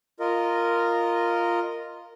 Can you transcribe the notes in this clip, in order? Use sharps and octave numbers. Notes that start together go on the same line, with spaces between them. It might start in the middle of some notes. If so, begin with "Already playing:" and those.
F4 A#4 D#5